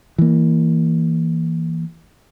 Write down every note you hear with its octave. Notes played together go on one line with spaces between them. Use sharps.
E3 A#3